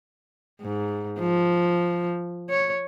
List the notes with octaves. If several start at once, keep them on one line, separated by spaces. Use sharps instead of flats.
G#2
F3
C#5